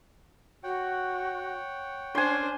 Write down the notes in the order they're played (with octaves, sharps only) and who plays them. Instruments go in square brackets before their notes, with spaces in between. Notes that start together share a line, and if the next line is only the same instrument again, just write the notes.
[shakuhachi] F#4 [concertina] C#5 F#5 G5
[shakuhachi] C#4 [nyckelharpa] D4 C5 [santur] G#5 C6